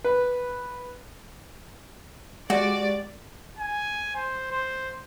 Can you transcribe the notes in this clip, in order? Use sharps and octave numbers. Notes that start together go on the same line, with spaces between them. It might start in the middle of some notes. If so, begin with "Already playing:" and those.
B4
G#3 F#4 G4 D5
G#5
C5
C5